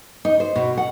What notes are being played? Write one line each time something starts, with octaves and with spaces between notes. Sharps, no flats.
D#4
C5
B2
F#5